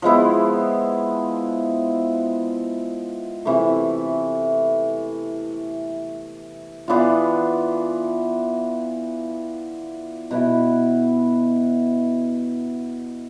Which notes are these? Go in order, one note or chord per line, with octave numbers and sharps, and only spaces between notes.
F3 G#3 B3 E4
C3 E3 A3
E3 B3 D4 F4
B2 B3 E4